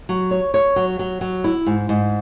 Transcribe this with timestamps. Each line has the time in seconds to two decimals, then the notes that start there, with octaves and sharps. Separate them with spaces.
0.09 F#3
0.31 C#5
0.54 C#5
0.76 F#3
0.99 F#3
1.21 F#3
1.44 E4
1.66 G#2
1.89 G#2